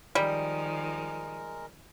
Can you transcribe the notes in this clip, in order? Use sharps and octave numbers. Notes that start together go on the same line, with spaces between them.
D#3 F3 G3 G#3 A#4